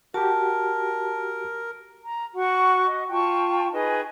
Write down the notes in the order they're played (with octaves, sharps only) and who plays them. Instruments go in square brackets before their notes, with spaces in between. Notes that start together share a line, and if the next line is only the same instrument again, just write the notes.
[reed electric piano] F#4 G4 [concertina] A#4 [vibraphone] A5
[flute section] A#5
F#4 F#5 C#6
D#5
F4 G5 A5 C#6
D#4 G#4 B4 D#5